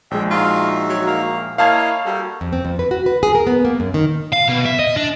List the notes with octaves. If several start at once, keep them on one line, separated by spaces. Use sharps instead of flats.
A#1 G#3 E5 G5
D#4 F4 F#4 E5
F#3
A#3
A#3 E4 C#5 D#5 F5 A5 G#6
G3 F#4 A4 A#4
F2
C4
F2
B4
F#4
B4
G#4
A#4
B3
A#3
F#2
D#3
F5
B2
E5
D#5
D4